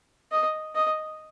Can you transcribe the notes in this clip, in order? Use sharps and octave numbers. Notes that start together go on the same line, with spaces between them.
D#5
D#5